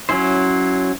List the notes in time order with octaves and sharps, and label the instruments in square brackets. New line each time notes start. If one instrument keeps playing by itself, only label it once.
[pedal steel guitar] F#3 C#4 E4 C5